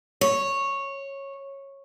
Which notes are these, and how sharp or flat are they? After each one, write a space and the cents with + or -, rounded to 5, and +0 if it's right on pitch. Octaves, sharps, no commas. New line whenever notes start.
C#5 -10